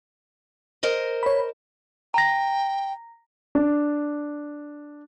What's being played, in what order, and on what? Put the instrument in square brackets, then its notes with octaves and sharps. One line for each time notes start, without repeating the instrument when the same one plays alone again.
[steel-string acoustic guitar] A#4 C5 D#5
[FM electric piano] C#5 B5
[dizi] G5 [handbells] A#5 A#6
[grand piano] D4